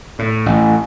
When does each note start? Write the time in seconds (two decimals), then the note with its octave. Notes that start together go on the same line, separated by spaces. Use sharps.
0.19 A2
0.46 A1